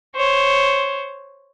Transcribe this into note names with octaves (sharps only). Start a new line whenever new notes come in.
C5 C#5